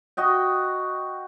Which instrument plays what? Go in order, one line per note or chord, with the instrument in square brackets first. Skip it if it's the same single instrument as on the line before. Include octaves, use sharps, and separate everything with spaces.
[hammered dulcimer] F#4 D#5 G5